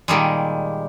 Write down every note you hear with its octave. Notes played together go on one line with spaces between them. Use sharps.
A#2 D#3 G3 G#3